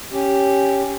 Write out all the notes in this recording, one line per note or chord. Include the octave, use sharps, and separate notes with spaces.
C#4 G4